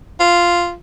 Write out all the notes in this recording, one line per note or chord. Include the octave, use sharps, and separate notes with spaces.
F4